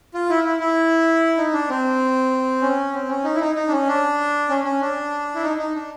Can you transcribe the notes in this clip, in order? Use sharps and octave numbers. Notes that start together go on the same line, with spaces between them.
F4
E4
E4
E4
D#4
D4
C4
C#4
C4
C#4
D#4
E4
D#4
D#4
D4
C#4
D4
C#4
C#4
D4
E4
D#4
D#4
D4